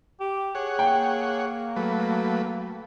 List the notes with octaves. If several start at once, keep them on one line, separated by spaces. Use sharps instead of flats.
G4
G#4 C#5 F#5
A#3 G5
F#3 A3 B4